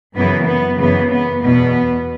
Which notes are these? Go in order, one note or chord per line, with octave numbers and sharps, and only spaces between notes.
F#2 C#3 E3 B3
B3
F#2 C#3 E3 B3
B3
E2 B2 B3